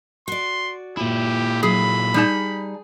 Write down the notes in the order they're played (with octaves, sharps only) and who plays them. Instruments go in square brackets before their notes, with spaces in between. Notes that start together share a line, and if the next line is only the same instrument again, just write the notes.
[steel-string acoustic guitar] F#4 D5 [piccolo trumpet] C6
[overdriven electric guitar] A#2 E4 [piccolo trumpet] G4
[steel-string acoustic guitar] F#3 [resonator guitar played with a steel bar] G#4 [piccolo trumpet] B5
[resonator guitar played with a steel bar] G3 D#4 A5 [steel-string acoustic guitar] G#4